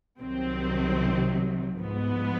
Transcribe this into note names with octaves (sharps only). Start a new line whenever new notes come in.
C2 C3 D#3 F#3 C4
G#2 F3 B3